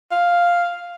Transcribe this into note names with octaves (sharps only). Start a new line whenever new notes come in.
F5